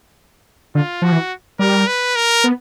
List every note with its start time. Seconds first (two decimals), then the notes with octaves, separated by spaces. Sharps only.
0.75 D3 F4
1.02 F3 F#4
1.12 E3
1.59 G3 A#4
1.87 B4
2.16 A#4
2.44 B3